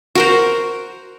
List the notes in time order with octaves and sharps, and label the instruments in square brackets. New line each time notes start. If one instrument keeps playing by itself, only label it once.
[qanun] F#4 A#4 C5